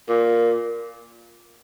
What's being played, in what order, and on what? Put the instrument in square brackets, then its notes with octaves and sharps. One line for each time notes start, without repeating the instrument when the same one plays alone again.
[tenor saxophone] A#2